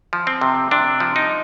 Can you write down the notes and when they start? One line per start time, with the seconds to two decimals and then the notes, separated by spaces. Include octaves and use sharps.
0.13 F3
0.27 C4
0.41 C3
0.71 C3 D4
1.00 F3
1.16 D#4